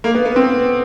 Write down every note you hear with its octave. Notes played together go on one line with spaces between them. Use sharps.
A#3
B3
B3
C4